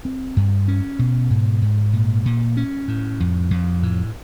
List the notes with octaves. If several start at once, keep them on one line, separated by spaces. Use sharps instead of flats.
C4
G2
C#4
B2
G#2
G#2
A#2
A#2
C#4
A2
F2
F2
A2